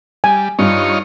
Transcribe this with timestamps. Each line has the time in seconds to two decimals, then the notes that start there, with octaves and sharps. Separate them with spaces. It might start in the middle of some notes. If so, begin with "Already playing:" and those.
0.24 G3 G#5
0.59 G2 D#4 F4 C#5